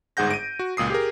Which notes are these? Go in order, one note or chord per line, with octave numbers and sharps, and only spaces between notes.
G1 G#2 G#4 F#5 G6 A#6
D7 D#7
F#4
C#2 A#2 D#6 C7
G4 G#4 A#4